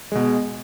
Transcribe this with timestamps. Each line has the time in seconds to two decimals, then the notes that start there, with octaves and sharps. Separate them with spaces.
0.12 B2 G#3